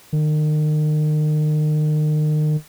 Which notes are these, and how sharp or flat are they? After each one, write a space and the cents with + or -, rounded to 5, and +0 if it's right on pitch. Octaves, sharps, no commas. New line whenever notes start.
D#3 -35